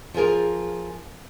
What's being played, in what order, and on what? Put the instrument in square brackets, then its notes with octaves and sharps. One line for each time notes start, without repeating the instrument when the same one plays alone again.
[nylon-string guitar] F3 F4 G#4 A#4